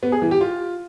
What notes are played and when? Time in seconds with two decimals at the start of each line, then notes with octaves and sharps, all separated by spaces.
0.03 B3
0.12 G#4
0.22 E3
0.31 G4
0.41 F4